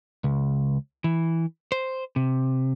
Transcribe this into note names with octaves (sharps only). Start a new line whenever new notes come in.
C#2
E3
C5
C3